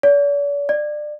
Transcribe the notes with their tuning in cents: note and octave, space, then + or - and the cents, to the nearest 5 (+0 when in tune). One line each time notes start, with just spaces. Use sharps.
D5 -45
D5 +25